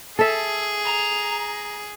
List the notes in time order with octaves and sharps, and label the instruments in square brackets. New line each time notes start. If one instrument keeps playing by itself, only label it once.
[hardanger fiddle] G#4 [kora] A4 E5
[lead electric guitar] A#5